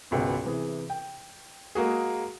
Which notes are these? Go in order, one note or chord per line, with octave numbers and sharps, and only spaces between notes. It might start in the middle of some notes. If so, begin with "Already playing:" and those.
G#1 C#2 B2
C3 E3 G#4
G5
G#3 A#3 F#4 G#4